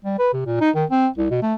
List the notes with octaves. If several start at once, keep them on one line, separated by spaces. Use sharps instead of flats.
G3
B4
C3
A#2
D#4
D#3
C4
C2
B2
A3